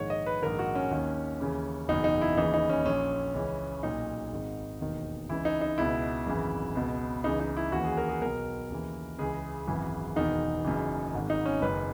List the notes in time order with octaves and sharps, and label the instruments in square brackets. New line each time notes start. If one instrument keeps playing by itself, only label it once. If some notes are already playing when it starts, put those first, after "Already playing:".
Already playing: [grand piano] A#1 G#2 D#3 C#5
D#5
B4
A#1 G#2 D#3 A#4
F#4
C#4
D#2 D#3
D#2 C#3 E3
F#1 E2 B2 D#4
D#4
E4
D#2 C#3 E3 D#4
D#4
C#4
A#1 A#2 C#4
C#2 C#3 E3
B1 A#2 D#4
G#1 G#2 D#3
E1 D#2 D#3
C#2 C#3 E3 E4
D#4
D#4
C#2 B2 E4
G#1 F#2 C#3 E3
C#2 B2
C#2 C#3 E3 D#4
D#4
E4
D#2 C#3 E3 F#4
G#4
A#4
G#4
B1 B2 A#4
D#2 C#3 E3
C#2 C#3 E3 G#4
G#1 F#2 C#3 E3
E1 E2 D#3 D#4
F#1 F#2 C#3 E3
G#1 G#2 D#3
D#4
C#4
F#1 F#2 D#3 B4